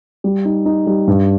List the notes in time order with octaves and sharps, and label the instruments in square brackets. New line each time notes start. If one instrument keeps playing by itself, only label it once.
[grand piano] G3
D#4
D#4
G3
G2